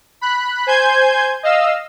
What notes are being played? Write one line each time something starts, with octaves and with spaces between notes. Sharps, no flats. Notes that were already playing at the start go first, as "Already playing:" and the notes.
B5 F#6
C5 G#5 G6 G#6
D#5 F5 E6